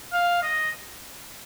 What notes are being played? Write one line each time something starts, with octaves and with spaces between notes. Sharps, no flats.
F5
D#5